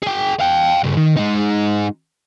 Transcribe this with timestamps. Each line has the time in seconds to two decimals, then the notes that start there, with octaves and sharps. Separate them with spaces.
0.03 G#4 G5
0.40 F5 G5
0.84 G2 C#3
0.97 D#3
1.17 G#3 D#4